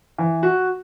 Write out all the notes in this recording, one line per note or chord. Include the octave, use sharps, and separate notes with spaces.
E3
F#4